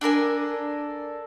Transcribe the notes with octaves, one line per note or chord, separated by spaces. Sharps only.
D4 A4 A#4 G#5